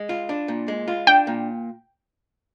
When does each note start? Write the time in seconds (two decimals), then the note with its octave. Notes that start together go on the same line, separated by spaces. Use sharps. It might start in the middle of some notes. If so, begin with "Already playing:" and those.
Already playing: G#3
0.09 F4
0.29 D4
0.48 A#2
0.68 G#3
0.88 F4
1.07 D4 G5
1.27 A#2